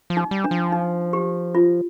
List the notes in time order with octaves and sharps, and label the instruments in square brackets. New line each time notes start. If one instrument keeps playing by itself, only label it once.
[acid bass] F3
[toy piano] D#4
[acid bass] G3
[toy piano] D4
[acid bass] F3
[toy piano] D#4
G4
F4